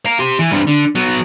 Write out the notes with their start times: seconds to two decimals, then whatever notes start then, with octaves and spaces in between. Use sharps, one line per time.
0.06 F5 A#5
0.19 G4 C6
0.39 E3
0.51 G2 C3
0.67 D3
0.95 F#3 B3